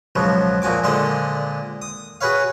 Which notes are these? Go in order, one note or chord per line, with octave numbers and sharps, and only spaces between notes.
C#2 B2 F3 F#3
A#2 F3 F#4 G#5 D6
A#2 D3 G#3 G#4 C5
D#6
F#4 G#4 B4 C#5 F5